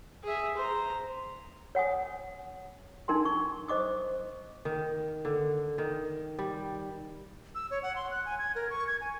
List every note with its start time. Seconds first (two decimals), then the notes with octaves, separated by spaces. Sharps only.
0.24 G#4 E5
0.57 C5 A#5
1.75 C#5 F#5 G#5 D#6
3.08 D4 D#4 A#4 G#5 C6
3.25 C#6
3.68 C5 D#5 D6 D#6
4.65 D#3
5.25 D3
5.78 D#3
6.39 G3
7.55 E6
7.71 C#5
7.83 F#5
7.96 C6
8.11 F#6
8.26 G#5
8.39 G#6
8.55 A#4
8.70 C#6
8.87 G#6
9.01 G#5